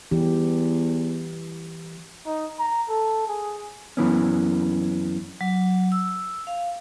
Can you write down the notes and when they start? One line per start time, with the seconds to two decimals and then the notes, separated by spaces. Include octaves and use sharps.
0.11 E2 E3 G4
2.26 D#4
2.59 A#5
2.89 A4
3.28 G#4
3.97 F#2 E3 B3 C#4
5.41 F#3
5.92 E6
6.47 F5